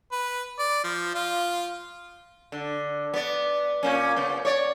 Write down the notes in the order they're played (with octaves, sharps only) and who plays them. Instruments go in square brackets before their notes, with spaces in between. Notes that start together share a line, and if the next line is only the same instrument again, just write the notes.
[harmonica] B4
D5
F3
F4
[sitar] D3
B3 D5
A#2 A#3 C#4
C#3 B3
C#5 D5